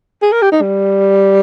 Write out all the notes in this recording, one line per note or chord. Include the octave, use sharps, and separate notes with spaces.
G#4
A#4
G4
D#4
G3